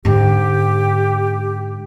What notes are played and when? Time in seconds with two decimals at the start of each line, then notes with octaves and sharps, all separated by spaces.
0.05 G#2 D3 G4